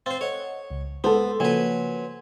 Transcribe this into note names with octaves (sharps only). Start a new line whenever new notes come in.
C4 C5 F5 A6
A4 C#5 D#5 F#5
C#2
G#3 B3 A4 C5
C#3 F3 F#3 A#3 B4 G#5